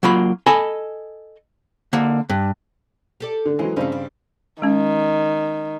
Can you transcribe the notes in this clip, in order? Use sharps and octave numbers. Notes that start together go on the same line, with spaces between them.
F#3 A#3 F4 B5
A4 D#5 G#5 A5 B5
D3 A#3
G2
G4 A4 D5
D3
E3 F#3 G#3 C5 D#5
G2 C#3 A3 C4 D#4
G3
D#3 G#3 C#4